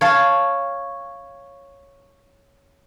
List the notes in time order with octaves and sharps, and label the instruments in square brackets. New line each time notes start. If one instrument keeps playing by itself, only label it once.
[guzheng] C#5 F5 A5